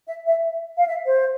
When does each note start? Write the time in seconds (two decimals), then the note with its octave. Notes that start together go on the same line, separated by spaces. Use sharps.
0.07 E5
0.27 E5
0.77 F5
0.87 E5
1.06 C5